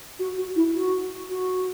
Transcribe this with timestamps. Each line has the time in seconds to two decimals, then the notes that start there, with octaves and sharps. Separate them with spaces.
0.19 F#4
0.37 F#4
0.55 E4
0.75 F#4
1.29 F#4